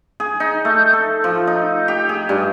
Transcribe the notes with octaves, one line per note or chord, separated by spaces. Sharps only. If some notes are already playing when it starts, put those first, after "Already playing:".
G#4
D#4
A3
A4
F3
D#4
G4
G#4
G2